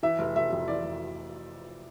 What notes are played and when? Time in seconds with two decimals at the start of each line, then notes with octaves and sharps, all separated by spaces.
0.03 E3 E5
0.19 F1
0.36 F1 E5
0.53 F2
0.68 E3 D5
0.84 F1